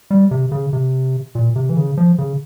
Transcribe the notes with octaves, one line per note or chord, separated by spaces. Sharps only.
G3
C3
C#3
C3
A#2
C3
E3
C#3
F3
C#3